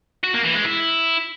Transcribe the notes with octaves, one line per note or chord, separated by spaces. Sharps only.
F#4
A#3
E3
G#3
E4